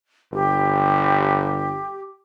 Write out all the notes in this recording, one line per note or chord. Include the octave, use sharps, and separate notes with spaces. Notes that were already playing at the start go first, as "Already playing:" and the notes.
G1 G4